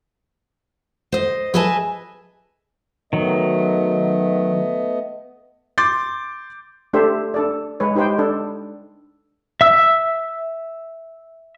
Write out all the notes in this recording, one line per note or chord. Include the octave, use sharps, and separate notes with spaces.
C5 D#5
G#4 B4 D#5 E5 G#5 A5
D#3 F#3 A3 B3 D#5
C6 D6 G6 A6
A3 D4 G4 A4 C5 E5
D4 A4 D5
G#3 B4 C#5
D#4 G4 B4 C5 G5
D4 A4
E5 E6